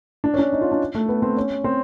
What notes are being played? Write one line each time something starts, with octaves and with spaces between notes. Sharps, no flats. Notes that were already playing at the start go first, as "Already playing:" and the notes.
D4
C#4
D4
D#4
F4
D4
A3
B3
C4
C#4
C4